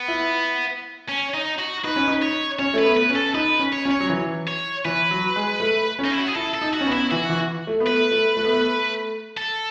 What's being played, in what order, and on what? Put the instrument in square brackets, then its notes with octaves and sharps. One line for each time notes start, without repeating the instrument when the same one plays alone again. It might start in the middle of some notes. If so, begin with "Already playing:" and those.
Already playing: [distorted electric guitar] B3
[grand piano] E4
[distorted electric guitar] C#4
D#4
F#4
[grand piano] D#4 [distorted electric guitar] B4
[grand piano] C#4
D#4
[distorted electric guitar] C#5
[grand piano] C#4 [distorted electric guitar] C#5
[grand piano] A3 [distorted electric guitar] B4
[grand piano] B3
[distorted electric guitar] B4
[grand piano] C#4
[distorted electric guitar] A4
[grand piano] D#4 [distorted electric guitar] B4
[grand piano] C#4
[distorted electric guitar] C#5
[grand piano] C#4
[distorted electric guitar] C#5
[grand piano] F#3
E3
[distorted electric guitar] C#5
[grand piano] E3 [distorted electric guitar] B4
[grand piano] F#3
G#3
A3
C#4
[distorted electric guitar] D#4
E4
F#4
G#4
[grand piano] E4 [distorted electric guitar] A4
[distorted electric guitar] A4
[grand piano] D#4
[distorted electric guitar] F#4
[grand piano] C#4
B3
[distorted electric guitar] E4
[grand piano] E3 [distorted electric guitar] F#4
[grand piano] E3
A3
B3
[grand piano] A3 [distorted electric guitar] B4
[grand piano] A3
A3
B3
A3
[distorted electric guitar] A4